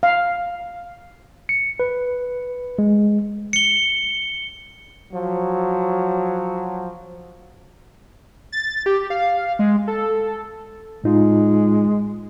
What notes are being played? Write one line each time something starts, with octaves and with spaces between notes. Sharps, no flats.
F5
C#7
B4
G#3
C#7 G7
F3 F#3
A6
G4
F5
G#3
A4
A2 G#3 D#4 F4